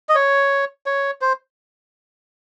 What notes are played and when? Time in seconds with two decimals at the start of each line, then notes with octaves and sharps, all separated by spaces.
0.09 D#5
0.15 C#5
0.86 C#5
1.21 C5